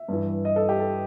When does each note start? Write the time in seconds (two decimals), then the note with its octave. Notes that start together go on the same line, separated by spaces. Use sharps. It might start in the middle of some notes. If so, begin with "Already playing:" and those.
Already playing: E5
0.08 G2 E3
0.45 D#5
0.56 A4
0.69 G4
0.80 A4